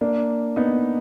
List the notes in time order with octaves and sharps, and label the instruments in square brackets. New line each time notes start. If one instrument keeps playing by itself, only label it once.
[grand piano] A#3 D4
B3 D#4